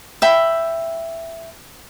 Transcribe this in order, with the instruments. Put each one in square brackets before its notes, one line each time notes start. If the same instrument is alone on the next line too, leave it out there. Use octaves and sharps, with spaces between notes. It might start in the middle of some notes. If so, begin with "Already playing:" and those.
[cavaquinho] E5 G5 B5